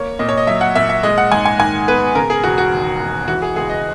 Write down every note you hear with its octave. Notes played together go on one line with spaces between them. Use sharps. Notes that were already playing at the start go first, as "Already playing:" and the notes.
Already playing: A#3 C#5
A#2 D#5
C#5
D#5
F#3 E5
F#5
A#2 E5
E5
G#3 D#5
F#5
G#2 G#5
G#5
D#3 G#5
B3 B4
C#3 A#4
G#4
E1 F#4
F#4
D#2
E1
E3 F#4
G#4
C#2 G#4
D#5